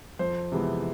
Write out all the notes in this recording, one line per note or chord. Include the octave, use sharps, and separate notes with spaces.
F2 C5
C3 E3 G#3 B3